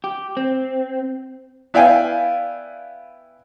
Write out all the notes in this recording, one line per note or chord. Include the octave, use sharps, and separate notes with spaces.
G4
C4
B3 E4 D5 F5 G5 G#5